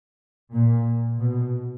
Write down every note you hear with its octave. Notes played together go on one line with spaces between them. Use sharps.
A#2
B2